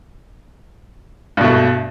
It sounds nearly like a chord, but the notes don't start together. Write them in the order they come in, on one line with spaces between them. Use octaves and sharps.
G2 B2 A3